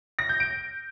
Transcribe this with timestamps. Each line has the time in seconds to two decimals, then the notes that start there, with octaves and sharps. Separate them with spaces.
0.19 A#6
0.29 G6
0.40 D7